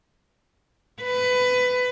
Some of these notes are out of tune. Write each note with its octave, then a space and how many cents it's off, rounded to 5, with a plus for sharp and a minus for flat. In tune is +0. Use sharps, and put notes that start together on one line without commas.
B4 +20